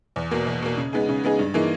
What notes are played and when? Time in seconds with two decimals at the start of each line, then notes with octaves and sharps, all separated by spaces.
0.16 E2
0.31 B2 A#3
0.47 E2
0.62 B2 A#3
0.77 C#3
0.93 G#3 B3 D#4 G#4
1.09 C#3
1.23 G#3 B3 D#4 G#4
1.39 G2
1.54 E3 A#3 D#4 G#4